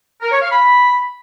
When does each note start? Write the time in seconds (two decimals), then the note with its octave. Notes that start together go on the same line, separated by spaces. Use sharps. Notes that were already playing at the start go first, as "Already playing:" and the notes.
0.21 A#4
0.31 C#5
0.41 F5
0.51 B5